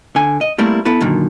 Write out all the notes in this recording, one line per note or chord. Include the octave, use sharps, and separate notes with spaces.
D3 G#5
D#5
G3 A3 A#3 C4 E4 A#4
B3 E4 A4 B4
F#2 A#2 D3 D#3